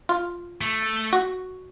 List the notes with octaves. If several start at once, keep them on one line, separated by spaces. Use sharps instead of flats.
F4
A3
F#4